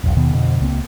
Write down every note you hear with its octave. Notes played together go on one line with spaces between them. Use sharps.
E1 B1
D#2 B2 D#3 B3
F2 B2 D3
C#2 A#3 C4